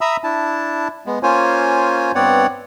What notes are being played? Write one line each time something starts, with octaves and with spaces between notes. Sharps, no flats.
E5 A#5 B5 D#6 E6
D4 E4 A5
G#3 B3
A#3 C#4 F4 C5 C#5 G#5
G2 B3 C4 C#5 D5 F#5